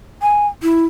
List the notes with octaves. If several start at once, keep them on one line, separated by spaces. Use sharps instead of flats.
G#5
E4